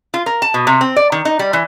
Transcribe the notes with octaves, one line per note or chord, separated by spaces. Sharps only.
F4
A#4
A5
B2
C3
C4
D5
D#3
D#4
G3
E3